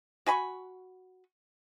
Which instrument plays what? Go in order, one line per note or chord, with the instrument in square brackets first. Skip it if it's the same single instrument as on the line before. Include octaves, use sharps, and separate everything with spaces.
[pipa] F#4 G#5 B5 C#6